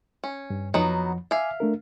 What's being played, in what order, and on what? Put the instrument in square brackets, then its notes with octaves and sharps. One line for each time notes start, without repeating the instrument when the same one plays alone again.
[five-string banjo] C#4
[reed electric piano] G2
[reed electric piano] F2 F3 [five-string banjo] F#3 B3 D#4
[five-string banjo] E5 F5 [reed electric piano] G#5 D6
[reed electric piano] A3 D4 A#4